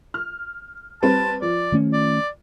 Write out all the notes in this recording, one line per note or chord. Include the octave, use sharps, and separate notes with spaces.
F6
G3 C4 B4 A5
F3 D5
D#3 A3 C#4
D5